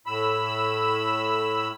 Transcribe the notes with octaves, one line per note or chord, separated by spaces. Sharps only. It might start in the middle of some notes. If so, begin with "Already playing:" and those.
A2 B5 E6